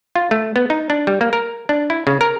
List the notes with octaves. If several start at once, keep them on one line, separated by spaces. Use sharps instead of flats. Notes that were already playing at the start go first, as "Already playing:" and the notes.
F4
A3
B3
D#4
D4
G3
A#3
A#4
D4
E4
C#3
A#4